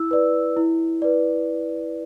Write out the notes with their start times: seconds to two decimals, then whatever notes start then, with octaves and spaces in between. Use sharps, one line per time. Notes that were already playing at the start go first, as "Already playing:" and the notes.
Already playing: E4 E6
0.11 B4 D5
0.57 E4
1.02 B4 D5